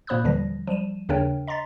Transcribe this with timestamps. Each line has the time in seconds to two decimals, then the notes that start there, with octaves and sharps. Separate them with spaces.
0.07 A#2 A#3 C5 B5 D#6 F#6
0.24 D#2 D3 E3 F3 G3 A#6
0.67 F3 G3 D#7 E7
1.09 D#2 C#3 D4 A#4 C#5 G5
1.47 D#5 A#5 C6 A6 B6